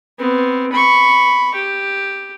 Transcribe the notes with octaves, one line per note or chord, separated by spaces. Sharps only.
B3 C4
B5 C#6
G4